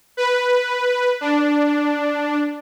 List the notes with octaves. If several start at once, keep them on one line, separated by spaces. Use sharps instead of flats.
B4
D4